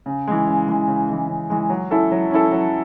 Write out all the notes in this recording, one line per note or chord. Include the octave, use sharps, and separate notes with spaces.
C#3
E3 G#3
C#3
E3 G#3
C#3
E3 G#3
C#3
E3 G#3
F#3
C#4 E4 A4
F#3
C#4 E4 A4
F#3